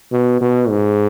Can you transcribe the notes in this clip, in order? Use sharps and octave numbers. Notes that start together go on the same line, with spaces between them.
B2
B2
G#2